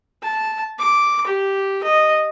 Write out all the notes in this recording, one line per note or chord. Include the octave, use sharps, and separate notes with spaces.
A5
D6
G4
D#5